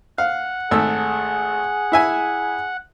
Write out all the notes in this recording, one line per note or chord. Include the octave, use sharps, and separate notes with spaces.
F5 F#5
G#1 A3 G#4 E6
E4 E5 G#5